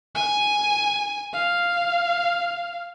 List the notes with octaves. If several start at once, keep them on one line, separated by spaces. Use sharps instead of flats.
G#5
F5